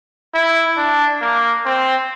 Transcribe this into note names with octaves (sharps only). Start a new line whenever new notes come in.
E4
D4
A#3
C4